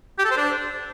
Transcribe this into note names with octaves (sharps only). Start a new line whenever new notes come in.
G4
A4
C5
D4